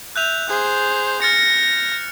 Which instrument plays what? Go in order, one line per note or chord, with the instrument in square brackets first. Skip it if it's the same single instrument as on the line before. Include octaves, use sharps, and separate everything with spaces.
[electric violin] E5 [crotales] F#6 G6 F7
[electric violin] G#4 C5
[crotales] F6 A6 C#7 [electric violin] A#6